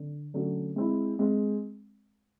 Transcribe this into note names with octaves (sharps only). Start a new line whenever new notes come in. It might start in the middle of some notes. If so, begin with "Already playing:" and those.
Already playing: D3
D3 F#3 A3 C#4 F#4
G#3 C4 E4
G#3 C4